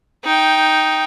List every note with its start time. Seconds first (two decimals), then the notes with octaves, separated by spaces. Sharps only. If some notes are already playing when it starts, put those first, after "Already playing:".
0.24 D#4 G5